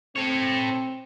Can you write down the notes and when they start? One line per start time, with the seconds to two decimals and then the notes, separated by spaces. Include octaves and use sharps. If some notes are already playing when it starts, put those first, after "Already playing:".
0.16 C4 A4 C#5